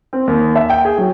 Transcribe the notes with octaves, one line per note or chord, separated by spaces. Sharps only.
C4
D#2
E5
G5
G#4
F#3